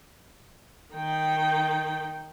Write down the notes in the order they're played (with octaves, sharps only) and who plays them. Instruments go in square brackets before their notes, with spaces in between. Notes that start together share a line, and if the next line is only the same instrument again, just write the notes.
[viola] D#3 G5